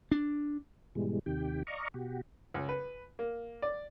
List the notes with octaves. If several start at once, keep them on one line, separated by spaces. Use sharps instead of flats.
D4
G#2 B2 E3 G3 G#3
D#2 C3 D#3 G4 G5
D5 D#5 F5 A#5 C#6
B2 F#4 G4
C#2
B4
A#3
D5